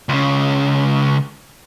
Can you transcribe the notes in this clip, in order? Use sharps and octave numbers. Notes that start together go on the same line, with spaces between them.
C#2 C#3